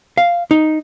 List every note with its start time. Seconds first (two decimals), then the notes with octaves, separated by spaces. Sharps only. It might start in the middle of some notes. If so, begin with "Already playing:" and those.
0.18 F5
0.51 D#4